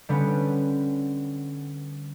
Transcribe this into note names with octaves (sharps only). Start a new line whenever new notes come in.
D3 G3 B3 C#4